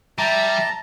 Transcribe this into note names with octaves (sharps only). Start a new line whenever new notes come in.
G3 E5 A5 A#5